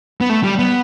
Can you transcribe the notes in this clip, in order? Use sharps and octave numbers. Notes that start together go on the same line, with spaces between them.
B3
A3
G3
B3